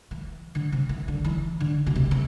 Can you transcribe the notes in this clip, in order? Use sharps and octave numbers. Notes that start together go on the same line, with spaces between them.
E3
D3
C3
E3
D3
E3
D3
B2
C3
C3